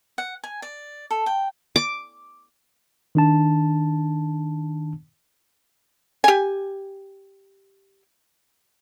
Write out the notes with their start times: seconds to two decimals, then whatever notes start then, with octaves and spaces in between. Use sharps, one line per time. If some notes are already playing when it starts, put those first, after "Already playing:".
0.18 F#5
0.44 G#5
0.62 D5
1.11 A4
1.26 G5
1.76 D6
3.15 D#3 D4 A5
6.24 G4 G#5